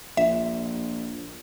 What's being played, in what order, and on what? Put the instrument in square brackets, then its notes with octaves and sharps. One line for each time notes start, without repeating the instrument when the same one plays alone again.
[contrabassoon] A#1 [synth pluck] E5